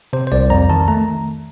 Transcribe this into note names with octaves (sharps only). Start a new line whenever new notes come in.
C3 C5
C5
C2 D5
F2 A#5
D#3 A5
A3 A#5